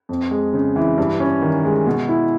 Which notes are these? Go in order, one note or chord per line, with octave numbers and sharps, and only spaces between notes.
F2
G#3
C#3
E3
G2
C#4
D#3
G#3
B2
E4